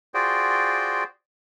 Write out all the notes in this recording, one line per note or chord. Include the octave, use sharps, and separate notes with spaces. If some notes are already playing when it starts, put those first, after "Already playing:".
F4 F#4 G#4 C5 D5 G5